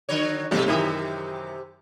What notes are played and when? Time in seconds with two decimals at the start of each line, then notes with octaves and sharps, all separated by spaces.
0.09 D3 F#3 C#5
0.51 B1 C3 G3 C4 G4 A4
0.66 F#2 C3 D#3 E3 G4 E5